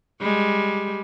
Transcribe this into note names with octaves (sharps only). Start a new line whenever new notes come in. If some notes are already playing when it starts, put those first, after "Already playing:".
G3 G#3